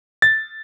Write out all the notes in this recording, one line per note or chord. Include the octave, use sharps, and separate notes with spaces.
A6